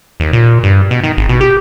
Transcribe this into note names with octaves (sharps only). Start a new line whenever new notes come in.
D#2
A#2
G2
B2
D#3
G#1
B2
G4